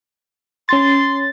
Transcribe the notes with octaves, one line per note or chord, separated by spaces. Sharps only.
C#4 C6 A6